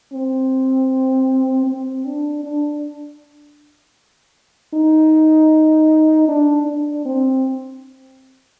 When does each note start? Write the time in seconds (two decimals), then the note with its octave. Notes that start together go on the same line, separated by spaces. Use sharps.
0.13 C4
1.66 C4
2.06 D4
2.44 D4
4.74 D#4
6.29 D4
6.66 D4
7.05 C4